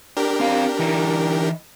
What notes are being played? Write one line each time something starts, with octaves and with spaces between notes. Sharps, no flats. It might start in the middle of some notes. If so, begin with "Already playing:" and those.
D4 G4 A#4
C4 F5
E3 D#4 E4